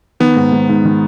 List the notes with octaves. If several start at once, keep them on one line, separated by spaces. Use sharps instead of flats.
D#3 B3
G#2
G#2
G#2
D#3